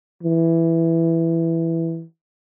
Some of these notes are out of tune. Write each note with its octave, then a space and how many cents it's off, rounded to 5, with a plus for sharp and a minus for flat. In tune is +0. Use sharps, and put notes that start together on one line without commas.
E3 +5